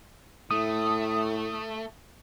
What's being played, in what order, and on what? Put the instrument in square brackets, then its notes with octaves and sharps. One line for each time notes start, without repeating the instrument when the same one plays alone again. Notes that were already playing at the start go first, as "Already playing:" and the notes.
[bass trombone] A2 [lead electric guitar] A3 [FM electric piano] D#6